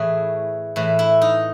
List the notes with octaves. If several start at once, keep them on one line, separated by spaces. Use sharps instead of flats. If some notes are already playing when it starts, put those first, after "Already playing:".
Already playing: A2 E3 G#4
A2 E3
E4
D#4